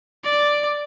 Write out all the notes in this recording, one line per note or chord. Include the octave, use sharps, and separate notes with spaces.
D5